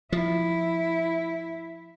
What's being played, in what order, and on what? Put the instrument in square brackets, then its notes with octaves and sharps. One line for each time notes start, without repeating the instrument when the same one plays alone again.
[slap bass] F3 [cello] E4